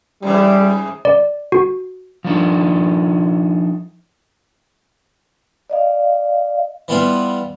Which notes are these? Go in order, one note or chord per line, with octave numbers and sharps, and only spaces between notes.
G#2 C#3 E3 G3
D5
F#4
F3 D4 D#4
D5 D#5 F5
E3 G3 B3 F4 B4